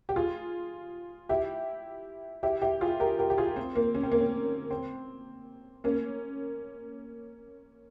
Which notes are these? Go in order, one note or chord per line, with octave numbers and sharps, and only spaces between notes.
G4
F4 G#4
E4 G4
E4 G4
E4 G4
F4 G#4
G4 A#4
G4 A#4
G4
F4 G#4
C4
A#3
C#4
C4
A#3
C4
C4
A#3 C#4